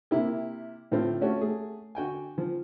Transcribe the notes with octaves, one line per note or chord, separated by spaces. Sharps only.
C3 A#3 E4 G4
A2 D3 C4 F4
A3 C#4 F#4 G4
A3 G#4
D3 F#4 G5 G#5
F3